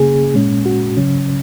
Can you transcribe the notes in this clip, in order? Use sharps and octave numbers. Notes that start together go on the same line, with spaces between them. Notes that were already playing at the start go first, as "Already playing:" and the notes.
Already playing: C#3 A#3 C#4 G#4
A#2 G#3 C#4
F#4
C#3 F#3 C#4